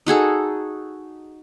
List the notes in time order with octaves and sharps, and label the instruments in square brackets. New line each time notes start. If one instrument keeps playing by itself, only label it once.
[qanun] D#4 F#4 G#4 A4